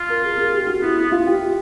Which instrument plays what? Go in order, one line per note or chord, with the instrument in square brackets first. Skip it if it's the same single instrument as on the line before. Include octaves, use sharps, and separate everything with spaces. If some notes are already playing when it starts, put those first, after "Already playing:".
Already playing: [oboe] F4
[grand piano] A#4
G#4
G#4
G4
F#4
[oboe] B3 [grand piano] E4
[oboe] B3 [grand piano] E4
[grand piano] F4
G4